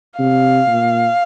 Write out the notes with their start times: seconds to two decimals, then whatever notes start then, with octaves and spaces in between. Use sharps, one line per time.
0.19 C3 F5
0.67 A#2